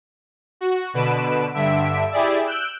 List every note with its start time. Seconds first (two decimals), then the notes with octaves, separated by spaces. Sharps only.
0.61 F#4
0.94 B2 D3 B4 D7 E7
1.53 G2 D3 E5 B6 D7
2.11 E4 G4 G#4 D5 E5
2.46 E6 F#6 G6 D7